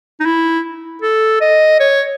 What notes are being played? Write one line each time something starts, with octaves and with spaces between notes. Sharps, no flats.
D#4
E4
A4
D#5
C#5